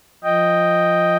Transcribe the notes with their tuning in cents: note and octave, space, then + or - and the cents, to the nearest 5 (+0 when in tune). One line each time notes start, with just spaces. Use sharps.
F3 +0 D#5 +0 G5 +0